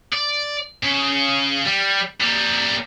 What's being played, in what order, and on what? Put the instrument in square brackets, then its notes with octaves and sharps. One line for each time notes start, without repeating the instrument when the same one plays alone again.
[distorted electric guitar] D5
C#3
G3
G3 A#3